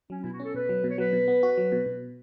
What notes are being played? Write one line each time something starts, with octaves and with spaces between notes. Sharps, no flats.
F#3 C#4
B2 E4
F#4
C#4 A4
B2 B4
F#3
B2 C#5
F#3 B4
B2
B3
F#4
F#3
B2
B2